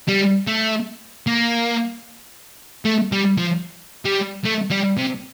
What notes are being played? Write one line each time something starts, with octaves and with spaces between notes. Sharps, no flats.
G3
A3
A#3
A3
G3
F3
G3
A3
G3
C3